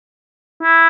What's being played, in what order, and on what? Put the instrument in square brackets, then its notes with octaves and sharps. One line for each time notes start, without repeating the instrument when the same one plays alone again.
[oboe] E4